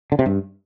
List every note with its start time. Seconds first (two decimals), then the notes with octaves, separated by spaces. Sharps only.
0.12 D3
0.19 C3
0.26 G2